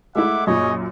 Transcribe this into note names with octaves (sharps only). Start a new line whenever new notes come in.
G#3 A3 E4 E5 F#5 D6
F#2 A#2 G#4 C#5 D#5